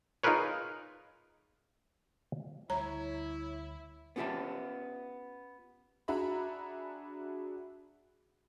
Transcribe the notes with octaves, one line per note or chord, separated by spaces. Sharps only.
D#4 F4 G#4 A#4 B4 C#5
D2 G3 E4 C#5 A#5
B3 C#4 F4 G4 E5 A5
D4 F#4 G#4 E5 A#5 B5